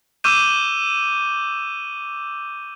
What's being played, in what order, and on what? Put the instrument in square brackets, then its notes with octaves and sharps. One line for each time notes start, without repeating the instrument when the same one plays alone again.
[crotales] C#6 D6 E6 F6 G6 D#7